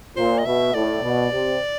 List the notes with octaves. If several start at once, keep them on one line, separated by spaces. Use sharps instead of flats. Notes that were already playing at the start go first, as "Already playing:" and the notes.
A#2 C5
D#5
B2 E5
A2 D5
B2
C3